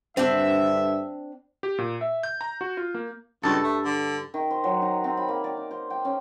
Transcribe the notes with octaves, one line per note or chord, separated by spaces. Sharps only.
G2 D3 C4 D4 E5
G4
A#2
E5
G6
A#5
F#4
F4
A#3
C#2 G2 A4
A3
D3
D#3
C5
F#3
D#4
C4
B5
A#3
D5
D#4
C5
G5
C#4